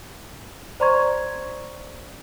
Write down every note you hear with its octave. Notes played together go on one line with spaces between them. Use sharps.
C5 D5 A#5 C6 C#6 G#6